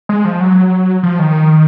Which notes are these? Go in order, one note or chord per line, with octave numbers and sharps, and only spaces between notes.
G#3
F3
F#3
F3
D#3